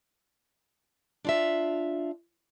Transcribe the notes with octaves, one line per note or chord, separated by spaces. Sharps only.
D4 F4 E5